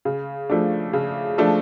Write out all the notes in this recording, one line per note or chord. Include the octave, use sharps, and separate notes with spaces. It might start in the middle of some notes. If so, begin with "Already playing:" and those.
C#3
F3 A3 D4
C#3
F3 A3 D4